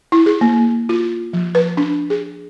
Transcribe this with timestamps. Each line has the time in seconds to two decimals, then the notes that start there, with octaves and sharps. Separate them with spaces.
0.12 E4
0.26 G#4
0.41 A#3
0.89 F4
1.33 F3
1.55 B4
1.77 D4
2.10 G#4